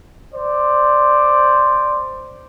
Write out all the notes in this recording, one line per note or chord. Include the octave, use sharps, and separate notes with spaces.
C5 D5